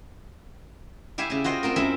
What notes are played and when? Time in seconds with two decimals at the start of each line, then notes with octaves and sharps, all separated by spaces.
1.18 E4 G4 E5 F5 G#5
1.30 C#3 E4
1.44 F4 F#4 C5 D#5 G5
1.63 C4 F4 A#4
1.76 F#2 C4 E4 E5